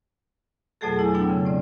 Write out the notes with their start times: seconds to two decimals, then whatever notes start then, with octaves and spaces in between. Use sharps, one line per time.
0.81 F2 B2 F#3 A3 G#4 A4
0.99 E4 G#5
1.14 F#3 B3 D4 G5 E6
1.30 C#3
1.45 A2 C4 D5